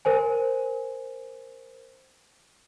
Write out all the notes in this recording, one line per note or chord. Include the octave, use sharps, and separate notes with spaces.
A#4 C5 G#5